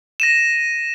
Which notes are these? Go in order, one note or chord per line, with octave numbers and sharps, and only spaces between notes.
A#6 D#7 E7